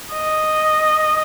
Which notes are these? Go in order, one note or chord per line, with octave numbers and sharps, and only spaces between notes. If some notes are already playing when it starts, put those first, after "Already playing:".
D#5